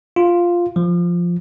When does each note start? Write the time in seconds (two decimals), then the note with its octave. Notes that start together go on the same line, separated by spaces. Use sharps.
0.16 F4
0.76 F3